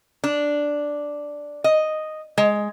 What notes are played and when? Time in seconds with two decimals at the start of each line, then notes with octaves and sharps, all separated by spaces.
0.24 D4
1.64 D#5
2.38 G#3